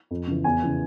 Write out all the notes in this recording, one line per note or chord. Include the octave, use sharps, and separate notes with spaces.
F2
C#3 E3
E2 G#5
C#3 E3